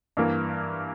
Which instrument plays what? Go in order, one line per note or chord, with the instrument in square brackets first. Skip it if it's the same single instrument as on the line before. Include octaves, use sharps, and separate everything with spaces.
[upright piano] G2 E3 A#3